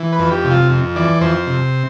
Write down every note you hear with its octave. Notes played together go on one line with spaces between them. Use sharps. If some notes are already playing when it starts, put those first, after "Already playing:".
Already playing: E3
B4
F2
G4
C3
F4
F2
E3 D5
F2 C5
C3